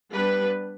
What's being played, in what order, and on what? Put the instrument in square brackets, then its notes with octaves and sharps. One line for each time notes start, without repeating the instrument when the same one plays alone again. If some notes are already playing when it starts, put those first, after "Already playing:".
[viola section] G3 B3 D4 B4